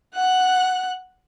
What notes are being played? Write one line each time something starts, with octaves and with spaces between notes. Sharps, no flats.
F#5 F#6